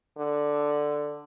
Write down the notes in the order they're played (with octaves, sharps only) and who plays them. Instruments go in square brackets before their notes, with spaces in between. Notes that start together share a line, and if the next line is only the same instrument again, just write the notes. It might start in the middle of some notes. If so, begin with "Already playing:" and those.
[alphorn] D3